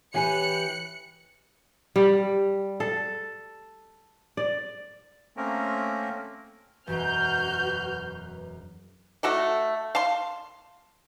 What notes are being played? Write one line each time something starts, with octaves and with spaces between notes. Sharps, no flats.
E3 G4 B4 C#5 G#5 F#6 C#7
G3
A4
D5
A3 A#3 C4 C#4 A#4
E1 F#2 F#4 B4 F6 G6
A3 F#4 A4 D5
F5 A5 C6